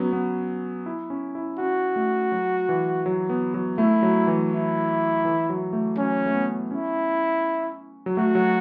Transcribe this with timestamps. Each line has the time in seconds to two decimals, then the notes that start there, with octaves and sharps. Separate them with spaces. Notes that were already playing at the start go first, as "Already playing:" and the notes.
Already playing: F#3 B3 C#4
0.13 B3
0.86 E4
1.10 C#4
1.35 E4
1.58 C#4 F#4
1.96 A3
2.32 F#3
2.69 E3
3.06 F#3
3.29 B3
3.54 F#3
3.78 A3 E4
4.03 F#3
4.27 E3
4.52 E4
5.25 E3
5.49 F#3
5.73 A3
5.98 F#3 C#4
6.26 A3
6.34 B3
6.71 C#4 E4
8.06 F#3
8.17 A3 F#4
8.35 F#3